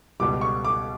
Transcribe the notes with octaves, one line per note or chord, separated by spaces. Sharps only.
C#2 B2 G3 D6
C#6
D6